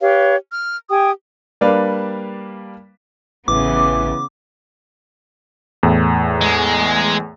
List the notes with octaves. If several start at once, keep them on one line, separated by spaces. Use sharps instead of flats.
G4 B4 C#5 F5
F6
G4 G5 G#5 D#6
G3 A#3 D4 B4 D5 F5
A1 C#3 E3 B3 D6
E2 A2
G#3